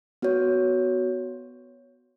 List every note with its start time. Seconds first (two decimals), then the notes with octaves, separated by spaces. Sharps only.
0.22 B3 F#4 C#5